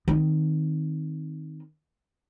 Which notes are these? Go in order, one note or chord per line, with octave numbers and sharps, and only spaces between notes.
D#3 C4